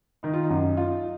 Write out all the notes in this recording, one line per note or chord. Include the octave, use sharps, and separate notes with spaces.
D#3 D#4
F4
D#4
F#2
F4